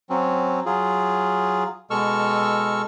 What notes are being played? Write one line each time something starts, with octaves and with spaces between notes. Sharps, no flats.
F#3 C4 C#4
F#3 F4 G#4
B2 G#3 A4 C#6 E6 F6